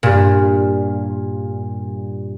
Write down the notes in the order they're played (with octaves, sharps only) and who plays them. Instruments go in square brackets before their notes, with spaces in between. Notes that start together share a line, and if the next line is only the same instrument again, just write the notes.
[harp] G2 A#2